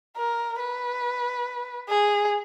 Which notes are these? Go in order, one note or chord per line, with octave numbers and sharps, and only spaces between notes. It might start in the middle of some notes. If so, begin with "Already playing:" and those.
A#4
B4
G#4